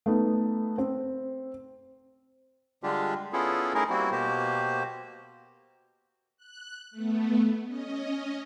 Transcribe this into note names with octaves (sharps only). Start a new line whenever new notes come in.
A3 B3 D#4
C4
D3 G3 G#3 D4 F4 G4
B3 C#4 E4 F4 G#4 A4
A3 C#4 D#4 E4 G#4 A#4
G3 A#3 C4 E4 F#4
B2 A#3 F#4 G4 C5
F#6
A3 B3
C#4 D#5